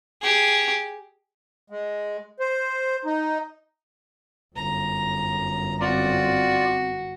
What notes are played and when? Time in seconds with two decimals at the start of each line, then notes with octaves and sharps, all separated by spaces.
0.22 G4 G#4
1.70 G#3
2.40 C5
3.05 D#4
4.56 G1 F#2 A#5
5.81 C4 F4 F#4 D5